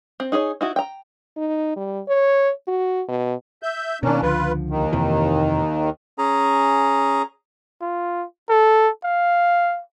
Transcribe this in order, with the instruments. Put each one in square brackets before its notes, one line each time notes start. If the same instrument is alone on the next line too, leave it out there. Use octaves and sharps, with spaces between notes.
[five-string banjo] C4
D#4 G#4 A#4 C#5
D#4 E4 F#4
G5 A#5
[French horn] D#4
G3
C#5
F#4
B2
[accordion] E5 G6
[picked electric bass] B2 D#3 [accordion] A#3 C#4 D4
[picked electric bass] C#2 D3 F3 [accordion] F4 B4
[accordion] D#2 D#3
[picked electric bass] F2 C3 E3
[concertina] C#4 G#4 A#5
[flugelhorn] F4
A4
F5